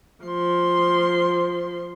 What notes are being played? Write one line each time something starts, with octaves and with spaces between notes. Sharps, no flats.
F3 C6